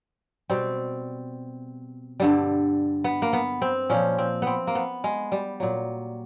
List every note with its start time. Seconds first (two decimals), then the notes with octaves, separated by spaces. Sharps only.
0.49 B2 G3 C4
2.20 G2 D3 G3
3.04 B3
3.22 A#3
3.33 B3
3.62 C4
3.90 A#2 F3 C#4
4.18 C4
4.42 B3 C4
4.67 A#3
4.75 B3
5.04 G#3
5.32 G3
5.60 A#2 F#3